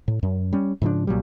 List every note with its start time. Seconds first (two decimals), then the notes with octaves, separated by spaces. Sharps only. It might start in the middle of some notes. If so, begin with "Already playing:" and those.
0.08 A2
0.23 F#2
0.53 G3 C#4
0.82 G#2 C#3 F3 D4
1.07 C2 A#2 F#3 G3